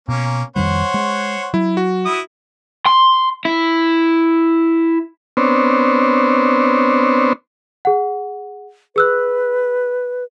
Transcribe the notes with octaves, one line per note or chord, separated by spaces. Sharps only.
B2 A#3 C#4
F2 D#3 G3 C5 C#5 F#5
G#3
F#3 E4
F#4
E4 D#6
C6
E4
B3 C4 D4 C5 C#5
G#4 F#5
G#4 B4 E6 F#6